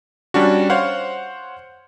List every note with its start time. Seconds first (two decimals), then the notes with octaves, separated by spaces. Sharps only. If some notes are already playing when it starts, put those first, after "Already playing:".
0.34 G3 C#4 D4 F#4
0.70 C5 C#5 F5 F#5